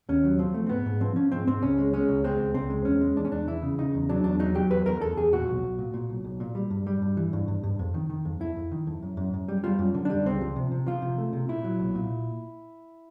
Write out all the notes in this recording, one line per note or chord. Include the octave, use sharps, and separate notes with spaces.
D#2 C#4
F#3
F3 C4
A3
C4
G#2 B3
G#2
F3 C4
F3 C#4
G#2 C4
G#2 C4
C#2 C#4
G#3
G#3 C#4
C#2
G#3 C4
C#2
C#2 C4
G#3
E2 C#4
G#3
E2 D4
C#4
E2 D4
E3 E4
C#3
C#3 D#4
E2
F#3 D4
E2 D4
F#3 D#4
F#3 G4
E2 B4
E2 A#4
E2 A4
E2 G#4
A#2 F#4
B1
B1
A#2
A#2
B1
B1
A#2
G3
G2
G3
G2
E3
G2
G2
G2
F2
D#3
D#3
F2
F2 E4
F2
D#3
F2
F#2
F#2
F#2
G3
G3 F4
F#2
D3
G3 D4
C#2 C4
F3
C3
C3
F3 F4
C3
A3
C3
A#2 E4
F#3
B1
A#2